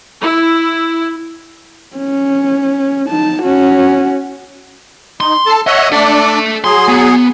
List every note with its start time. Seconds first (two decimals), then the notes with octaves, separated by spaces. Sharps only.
0.21 E4
1.96 C#4
3.08 D#4 A5
3.43 C#4 F#4
5.21 D#4 C6
5.46 A4 A5
5.67 C#5 D#5 E5 F#5
5.92 D4 A4 D5 E5
6.64 F#3 G#4 C6
6.88 B3